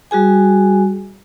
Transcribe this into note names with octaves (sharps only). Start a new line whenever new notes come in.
G3 F#4 G#4 G#5